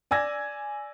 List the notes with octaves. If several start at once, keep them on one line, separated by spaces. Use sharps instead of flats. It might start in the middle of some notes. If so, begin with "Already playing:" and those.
D5 G#5 E6 G#6 A#6